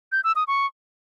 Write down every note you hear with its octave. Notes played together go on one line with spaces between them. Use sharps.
G6
E6
D#6
C#6